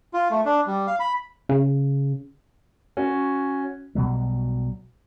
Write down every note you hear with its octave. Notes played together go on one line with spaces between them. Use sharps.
F4
A3
D4
G3
F5
B5
C#3
C#4 F#4
B1 B2 F#3 G3